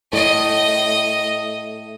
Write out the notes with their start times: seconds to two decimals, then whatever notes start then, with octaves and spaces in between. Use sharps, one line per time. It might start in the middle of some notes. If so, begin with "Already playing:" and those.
0.13 A2 D#5